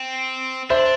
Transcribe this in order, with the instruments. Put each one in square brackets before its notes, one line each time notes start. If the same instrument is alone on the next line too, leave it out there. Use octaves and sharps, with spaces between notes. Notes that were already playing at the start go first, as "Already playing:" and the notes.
Already playing: [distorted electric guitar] C4
[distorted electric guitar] D4 [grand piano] C5 E5